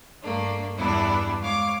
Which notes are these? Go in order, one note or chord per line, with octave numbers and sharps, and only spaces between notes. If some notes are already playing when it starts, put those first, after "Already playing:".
G2 A3 A#3 D4
E2 G2 G3 B3 D4 E4
G#3 C#5 F5 D6